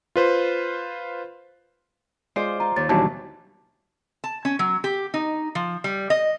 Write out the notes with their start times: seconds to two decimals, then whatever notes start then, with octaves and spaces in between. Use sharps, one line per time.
0.16 F4 B4 C5
2.36 G#3 F4 C5 D5
2.60 F4 A#5
2.76 D#2 A6
2.89 D#2 B2 E3 F#3 G3 D4 A5
4.24 A5
4.45 C#4
4.59 F#3
4.84 G4
5.14 D#4
5.55 F3
5.84 G3
6.10 D#5